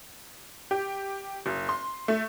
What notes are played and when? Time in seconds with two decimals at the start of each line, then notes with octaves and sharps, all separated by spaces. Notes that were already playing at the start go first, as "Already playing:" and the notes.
0.71 G4
1.46 F#1
1.69 C6
2.08 A3